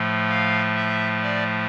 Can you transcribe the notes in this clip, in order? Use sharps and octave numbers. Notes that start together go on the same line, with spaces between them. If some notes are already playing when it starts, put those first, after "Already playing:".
Already playing: A2 F3 A3
F5
E5
D5